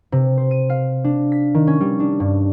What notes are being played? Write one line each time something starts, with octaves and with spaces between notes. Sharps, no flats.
C3
C5
D#7
F5
D4
B6
D#3
C#4
G3
D4
G2